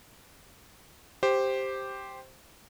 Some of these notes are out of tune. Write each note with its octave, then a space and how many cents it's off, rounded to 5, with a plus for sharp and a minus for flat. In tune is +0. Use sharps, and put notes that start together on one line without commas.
G4 +0 C5 +0